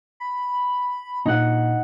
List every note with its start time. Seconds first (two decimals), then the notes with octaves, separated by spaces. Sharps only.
0.20 B5
1.26 A#2 D#4 F#5